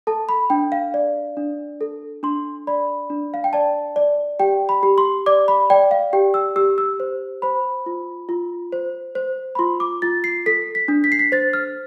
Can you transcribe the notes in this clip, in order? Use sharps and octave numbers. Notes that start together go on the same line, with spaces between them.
A4 A5
B5
D4 G5
F5
D5
D4
A4
D4 C6
D5 B5
D4
F5
G5
D5 A5
D5
G4 G5
B5
G4
C6
D5 D6
B5
D5 G5
F5
G4 G5
E6
G4 E6
E6
C5
C5 B5
F4
F4
C5
C5
B5
F4 C6
D6
F4 A6
C7
A4 B6
B6
D4
B6
C7
B6
C5 A6
F6